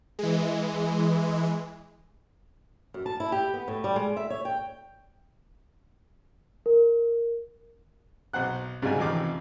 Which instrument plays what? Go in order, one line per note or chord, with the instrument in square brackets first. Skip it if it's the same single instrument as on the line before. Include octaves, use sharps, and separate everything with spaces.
[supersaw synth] E3 G#3
[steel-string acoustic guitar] F#2
A5
E4
G4
B3
A2
G3
G#3
E5
C#5
G5
[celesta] A#4
[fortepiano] B1 C5 F#5 F#6
G#2 C#3 G3 D#4 F#4 G#5
A1 F2 C3 D#3 F5 D6